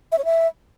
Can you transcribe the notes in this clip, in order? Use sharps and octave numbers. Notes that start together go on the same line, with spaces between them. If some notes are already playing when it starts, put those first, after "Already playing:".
E5
C#5
E5